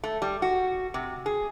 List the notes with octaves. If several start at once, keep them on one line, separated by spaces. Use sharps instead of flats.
A3
G3
F#4
C3
G#4